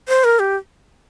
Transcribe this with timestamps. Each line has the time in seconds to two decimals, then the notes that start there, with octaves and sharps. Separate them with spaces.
0.08 C5
0.24 A#4
0.39 G4